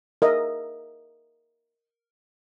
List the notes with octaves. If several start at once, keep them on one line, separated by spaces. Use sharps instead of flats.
A#4 D#5 E5